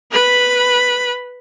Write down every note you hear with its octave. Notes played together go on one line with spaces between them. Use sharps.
B4 B5